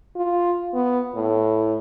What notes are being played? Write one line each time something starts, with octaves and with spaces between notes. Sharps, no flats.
F4
B3
A2